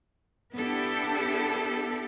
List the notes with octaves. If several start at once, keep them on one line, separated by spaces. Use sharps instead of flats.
B3 D4 E4 G4 A4